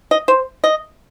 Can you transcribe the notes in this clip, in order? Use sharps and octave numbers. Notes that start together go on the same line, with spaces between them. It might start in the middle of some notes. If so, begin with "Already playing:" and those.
D#5
C5
D#5